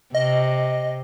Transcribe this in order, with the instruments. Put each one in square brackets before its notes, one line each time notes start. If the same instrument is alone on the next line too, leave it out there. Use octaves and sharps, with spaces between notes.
[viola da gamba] C3 [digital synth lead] D#5